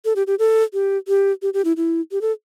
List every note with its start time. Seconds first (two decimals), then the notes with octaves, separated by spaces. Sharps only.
0.05 A4
0.16 G4
0.27 G4
0.39 A4
0.73 G4
1.08 G4
1.42 G4
1.54 G4
1.65 E4
1.77 E4
2.12 G4
2.21 A4